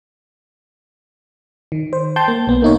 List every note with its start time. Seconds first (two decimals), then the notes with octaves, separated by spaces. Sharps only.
1.72 D#3
1.93 C5
2.16 G5 A5 C6 G6
2.28 A#3
2.47 B1 B3
2.62 A#3 D#4 C#5